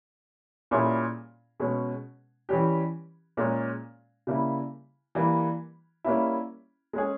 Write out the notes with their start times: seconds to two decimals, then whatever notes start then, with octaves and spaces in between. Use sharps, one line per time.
0.71 A#2 G3 C#4 E4 G#4
1.60 B2 G#3 C#4
2.49 E3 G3 C#4 G4
3.37 A#2 G#3 C#4
4.27 C#3 G3 A#3 E4
5.15 E3 G3 A#3
6.04 G3 A#3 C#4 E4
6.93 G#3 C#4 G#4